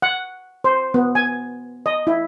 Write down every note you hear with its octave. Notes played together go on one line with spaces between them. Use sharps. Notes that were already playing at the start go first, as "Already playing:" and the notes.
F#5
C5
B3
G#5
D#5
E4